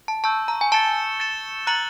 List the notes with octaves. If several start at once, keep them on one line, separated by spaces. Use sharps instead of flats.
A5
A5 C#6 E6 G6
A#5
G#5
A5 A6 C#7 E7 G7
A6 C#7 E7 G7
A#5 F#6 A6 C#7 F#7